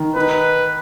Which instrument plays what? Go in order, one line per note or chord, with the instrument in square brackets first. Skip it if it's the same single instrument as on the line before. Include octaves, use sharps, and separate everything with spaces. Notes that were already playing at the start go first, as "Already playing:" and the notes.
Already playing: [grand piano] D#3
[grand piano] D#4 [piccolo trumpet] B4